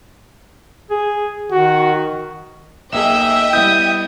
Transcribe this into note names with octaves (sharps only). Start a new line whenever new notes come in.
G#4
D#3 F#4
B1 A#3 G#4 D#5 E5 G5 E6
G3 B3 E4 D#6 G6